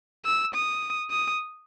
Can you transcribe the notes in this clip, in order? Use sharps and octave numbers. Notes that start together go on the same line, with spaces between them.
E6
D#6
D#6